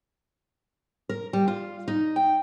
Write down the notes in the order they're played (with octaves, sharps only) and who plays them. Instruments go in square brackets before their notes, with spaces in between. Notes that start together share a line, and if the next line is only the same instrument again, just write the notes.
[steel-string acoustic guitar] A#4
G3
F4
D#4
G5